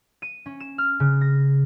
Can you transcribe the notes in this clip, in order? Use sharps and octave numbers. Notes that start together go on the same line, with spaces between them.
D#7
C#4
E7
F6
C#3
A#6